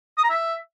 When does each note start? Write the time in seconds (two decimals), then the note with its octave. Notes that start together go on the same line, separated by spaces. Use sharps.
0.18 D#6
0.24 A#5
0.30 E5